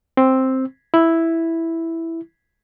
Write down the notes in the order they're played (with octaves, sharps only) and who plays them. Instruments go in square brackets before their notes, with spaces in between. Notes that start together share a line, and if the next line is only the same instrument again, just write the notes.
[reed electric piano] C4
E4